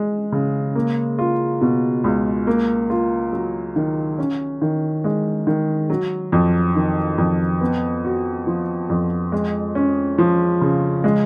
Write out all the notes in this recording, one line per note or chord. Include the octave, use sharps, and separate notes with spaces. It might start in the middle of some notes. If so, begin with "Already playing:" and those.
Already playing: G#3
C#3
A#3
F4
B2
C#2
A#3
F4
F#3
D#3
C#4
D#3
G#3
D#3
F#3
F2
D#3
F2
B3
F#4
F3
F2
G#3
C#4
F3
C#3
G#3